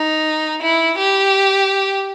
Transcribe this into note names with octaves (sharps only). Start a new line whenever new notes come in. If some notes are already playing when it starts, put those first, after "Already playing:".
Already playing: D#4
E4
G4